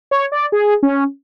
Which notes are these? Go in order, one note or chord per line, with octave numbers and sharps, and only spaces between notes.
C#5
D5
G#4
C#4